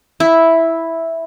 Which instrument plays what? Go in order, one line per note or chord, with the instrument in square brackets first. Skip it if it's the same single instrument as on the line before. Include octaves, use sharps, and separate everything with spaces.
[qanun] E4